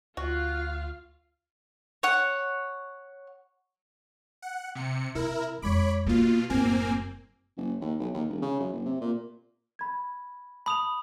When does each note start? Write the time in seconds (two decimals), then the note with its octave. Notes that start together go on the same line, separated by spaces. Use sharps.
0.17 D2 F4 F#4 F5
2.03 C#5 F#5
4.42 F#5
4.75 C3 C#7
5.15 C3 E4 A#4
5.62 F2 G#3 C#5 B5 D6
6.06 B2 A#3 F4
6.50 F#1 A2 A#3 C4 G#5
7.57 F#1
7.81 D#2
7.99 B1
8.14 D#2
8.29 E1
8.42 C#3
8.60 F#2
8.73 F#1
8.86 C3
9.01 A#2
9.79 B5 G#6
10.66 A5 B5 D#6 F7